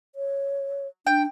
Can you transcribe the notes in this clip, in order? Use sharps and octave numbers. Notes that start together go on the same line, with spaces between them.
C#5
D4 G5